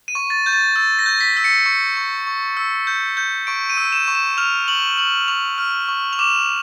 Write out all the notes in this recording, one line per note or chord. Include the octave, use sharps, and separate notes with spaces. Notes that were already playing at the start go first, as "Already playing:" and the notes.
D#7
C#6
A6
G6
A6
E6 A6
A#6
G6
B6
E6
C#7
C#6
C#6
C#6
E6
G6
G6
C#6 D7
D#7
E6
E7
C#6
E7
F6 F7
C#6 F#7
C#6 F#7
C#6 F7
F6
C#6
F7
D6 E7